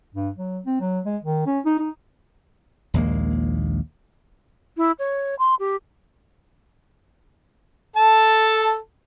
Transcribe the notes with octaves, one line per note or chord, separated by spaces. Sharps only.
G2
F#3
C4
F#3
G#3
D#3
C#4
D#4
D#4
A#1 D#2 G#3 A#3
E4
C#5
C6
G4
A4 A5